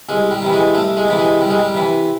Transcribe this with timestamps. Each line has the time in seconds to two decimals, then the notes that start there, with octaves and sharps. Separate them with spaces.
0.09 C2 G#3
0.31 G3
0.42 C3 E3
0.53 G#3
0.75 C2 A3
0.97 G#3
1.08 C3 E3
1.19 G#3
1.41 C2 G3
1.50 G#3
1.59 G3
1.74 C3 E3